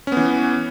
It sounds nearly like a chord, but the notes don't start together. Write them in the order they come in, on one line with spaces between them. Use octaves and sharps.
C#4 B3 E3